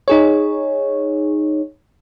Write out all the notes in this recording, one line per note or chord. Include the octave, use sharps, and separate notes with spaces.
D#4 G#4 C#5